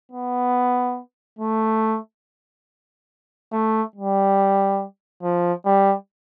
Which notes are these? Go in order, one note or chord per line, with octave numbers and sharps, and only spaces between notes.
B3
A3
A3
G3
F3
G3